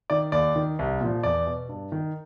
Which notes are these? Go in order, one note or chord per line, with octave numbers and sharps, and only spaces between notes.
D#3 D5
D#2 D5
D#3
C2
A#2 F3
E2 D5
B2
G2
D#3